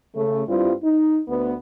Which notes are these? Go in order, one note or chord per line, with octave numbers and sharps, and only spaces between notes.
C#3 A3
G2 G3 C4 E4 F4
D#4
D2 B3